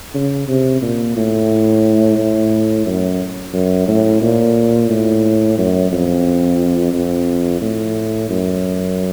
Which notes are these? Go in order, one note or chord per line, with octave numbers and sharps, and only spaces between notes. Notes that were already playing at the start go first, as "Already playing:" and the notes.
C#3
C3
A#2
A2
A2
F#2
F#2
A2
A#2
A2
F#2
F2
F2
A2
F#2